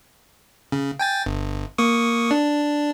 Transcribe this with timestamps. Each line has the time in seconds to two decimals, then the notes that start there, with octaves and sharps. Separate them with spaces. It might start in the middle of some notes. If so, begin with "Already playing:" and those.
0.72 C#3
0.99 G5 G#5 A6
1.26 G1
1.78 A#3 C#6 D#6
2.31 D4